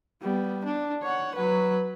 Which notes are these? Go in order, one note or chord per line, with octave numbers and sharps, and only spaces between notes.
G3 B3
D4
C#5 F#5
F#3 B4